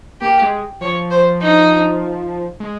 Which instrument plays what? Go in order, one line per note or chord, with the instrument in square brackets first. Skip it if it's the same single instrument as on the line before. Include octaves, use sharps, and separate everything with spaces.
[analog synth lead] A#3 [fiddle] G4
[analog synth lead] G#3
[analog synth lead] F3 [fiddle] C#5
[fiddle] C5
D#4
[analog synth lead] G#3